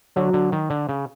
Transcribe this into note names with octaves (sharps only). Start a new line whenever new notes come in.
D3 F#3
D3
D#3
D3
C#3